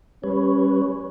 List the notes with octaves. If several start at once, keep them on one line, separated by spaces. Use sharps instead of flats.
G3 C#4 B4 C#5